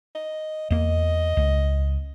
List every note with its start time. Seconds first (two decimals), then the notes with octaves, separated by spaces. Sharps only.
0.15 D#5
0.70 E2 A#3 D#5
1.37 C#2